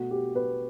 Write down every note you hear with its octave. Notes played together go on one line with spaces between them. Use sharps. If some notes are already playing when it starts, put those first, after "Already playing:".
Already playing: B2 A3 F#4
G4
B4